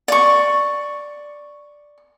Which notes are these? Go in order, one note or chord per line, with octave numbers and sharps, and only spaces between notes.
D5 C#6